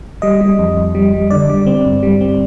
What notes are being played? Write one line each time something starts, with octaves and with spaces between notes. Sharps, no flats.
G3 D#5
G3
F2
F2
G3
G3
D3 D5
G3
C4
G2
G3
C4